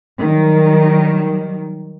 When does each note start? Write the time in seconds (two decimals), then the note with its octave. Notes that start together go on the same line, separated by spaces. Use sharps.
0.20 D#3 F#3 G3